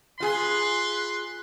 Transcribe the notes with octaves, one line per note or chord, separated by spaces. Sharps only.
F4 G#4 B4 C6